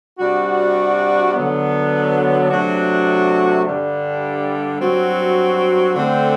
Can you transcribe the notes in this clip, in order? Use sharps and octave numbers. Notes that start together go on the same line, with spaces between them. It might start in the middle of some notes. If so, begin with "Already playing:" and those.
C3 G3 D4 F#4
D3 F#3 B3
C3 F#3 A3 D4 F#4
G2 D3 G3 D4
G2 F#3 C4 F#4
D3 A3 C4